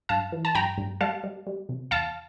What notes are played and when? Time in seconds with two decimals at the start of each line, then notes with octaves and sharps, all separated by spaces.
0.09 G2 F5 A5
0.32 E3
0.45 A5
0.55 G2 G5 A#5
0.78 G2
1.01 G3 F5 A5
1.24 G3
1.47 G3
1.69 C3
1.91 E2 F5 A5